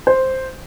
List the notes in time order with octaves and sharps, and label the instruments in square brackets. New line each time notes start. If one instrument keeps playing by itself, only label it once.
[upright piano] C5